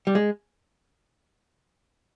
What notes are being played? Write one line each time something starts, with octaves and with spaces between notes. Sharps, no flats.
G3
G#3